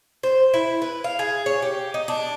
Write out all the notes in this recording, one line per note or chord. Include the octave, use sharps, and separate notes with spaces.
C5
E4
B4
F5
G#4
C#5
G4
D#4
D4